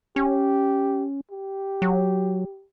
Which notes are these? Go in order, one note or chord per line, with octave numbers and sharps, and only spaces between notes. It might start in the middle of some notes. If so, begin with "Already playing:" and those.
C#4 G4
G4
F#3